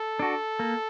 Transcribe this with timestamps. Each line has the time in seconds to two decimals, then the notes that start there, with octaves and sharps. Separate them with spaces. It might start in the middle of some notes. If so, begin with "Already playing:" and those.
Already playing: A4
0.20 D4 F#4
0.59 A#3